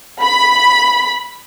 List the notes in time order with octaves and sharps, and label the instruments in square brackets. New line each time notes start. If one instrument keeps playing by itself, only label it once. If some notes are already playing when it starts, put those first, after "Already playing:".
[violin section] B5